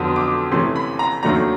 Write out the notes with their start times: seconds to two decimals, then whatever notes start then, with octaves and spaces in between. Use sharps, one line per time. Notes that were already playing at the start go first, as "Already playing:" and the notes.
Already playing: F2 D3 F#3 B3 D#6
0.16 D6
0.51 C3 E3 A3 C#4 C6
0.76 B5
0.99 A#5
1.23 D#2 D#3 F#3 A3 D4 A#5